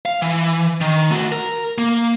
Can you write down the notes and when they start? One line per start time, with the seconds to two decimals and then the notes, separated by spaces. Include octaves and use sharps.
0.06 F5
0.22 E3
0.81 D#3
1.11 A3 F#4
1.32 A#4
1.78 A#3